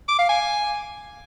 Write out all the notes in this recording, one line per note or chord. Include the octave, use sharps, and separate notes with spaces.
D6
F5
G#5